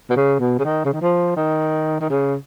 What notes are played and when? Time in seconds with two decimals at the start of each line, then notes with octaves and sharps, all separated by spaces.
0.10 B2
0.16 C#3
0.40 B2
0.59 C#3
0.64 D#3
0.85 C#3
0.93 D#3
1.01 F3
1.37 D#3
2.00 D#3
2.10 C#3